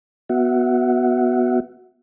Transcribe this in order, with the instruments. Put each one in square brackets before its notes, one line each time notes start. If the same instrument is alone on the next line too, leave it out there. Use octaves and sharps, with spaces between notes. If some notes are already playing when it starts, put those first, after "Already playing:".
[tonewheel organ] B3 F#4 E5 F#5